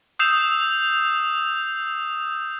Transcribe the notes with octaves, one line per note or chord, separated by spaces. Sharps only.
D#6 E6 G6 C7 E7 F7